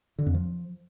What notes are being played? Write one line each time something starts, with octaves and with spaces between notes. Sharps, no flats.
D3
F2
F3